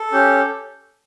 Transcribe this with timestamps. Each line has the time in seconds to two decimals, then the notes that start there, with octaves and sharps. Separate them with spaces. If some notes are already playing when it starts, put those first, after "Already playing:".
Already playing: A4
0.12 C#4 G4